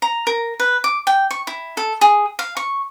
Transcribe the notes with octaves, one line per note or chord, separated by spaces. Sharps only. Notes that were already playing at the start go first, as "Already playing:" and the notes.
A#5
A#4
B4
D6
G5
C#6
E4
A4
G#4
F5
C#6